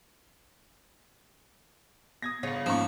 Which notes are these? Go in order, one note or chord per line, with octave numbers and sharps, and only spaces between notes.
B3 D#6 G#6 A#6
G1 C#3 F4 C#5 A#6
F#1 G#2 F3 A#3 C#4 A#5 C#6